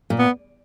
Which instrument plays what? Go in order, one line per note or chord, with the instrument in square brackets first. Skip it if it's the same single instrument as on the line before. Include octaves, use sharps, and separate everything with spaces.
[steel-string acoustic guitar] A#2
[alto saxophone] B3